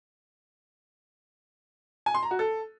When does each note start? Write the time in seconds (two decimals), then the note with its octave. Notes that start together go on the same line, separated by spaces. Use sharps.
2.06 G#5
2.14 C6
2.23 A#5
2.31 F#4
2.39 A4